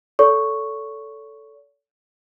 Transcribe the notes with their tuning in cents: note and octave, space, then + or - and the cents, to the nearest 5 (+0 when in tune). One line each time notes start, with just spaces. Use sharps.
A4 +0 C#5 +45 C#6 +0